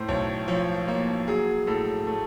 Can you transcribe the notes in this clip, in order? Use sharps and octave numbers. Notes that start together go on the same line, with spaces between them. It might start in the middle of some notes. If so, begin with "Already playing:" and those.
Already playing: A2 C5
B1 C#5
F3 C#5
A#3 C#5
F#3 G#4
A2 A4
A3